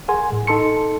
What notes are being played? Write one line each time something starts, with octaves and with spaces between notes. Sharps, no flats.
G#4 A#4 F#5 G#5 C6
A2
D#4 A4 A5 C6 C#7